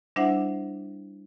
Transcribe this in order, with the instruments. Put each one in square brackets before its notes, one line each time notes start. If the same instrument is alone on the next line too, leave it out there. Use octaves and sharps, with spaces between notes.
[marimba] G3 D4 E4 C5 E5 F#5